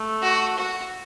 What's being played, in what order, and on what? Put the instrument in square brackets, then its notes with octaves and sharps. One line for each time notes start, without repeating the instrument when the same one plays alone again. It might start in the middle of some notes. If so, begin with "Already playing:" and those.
Already playing: [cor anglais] A3
[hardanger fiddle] F#4
F#4